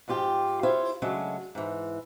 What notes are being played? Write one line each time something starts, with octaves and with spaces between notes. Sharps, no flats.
G#2 F3 F4 G4
E4 F4 C5 C#5 F5
C#3 F#3 G#3 A3 C#4 D4
G#2 E3